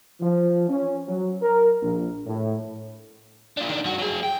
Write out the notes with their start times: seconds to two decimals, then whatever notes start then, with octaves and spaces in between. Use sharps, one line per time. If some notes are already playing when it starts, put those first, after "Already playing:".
0.21 F3
0.69 C#4
1.08 F#3
1.42 A#4
1.82 A#1
2.26 A2
3.57 D4 F4
3.69 D#3 D4
3.84 G2 F#4
3.99 F#3 G#4
4.23 G5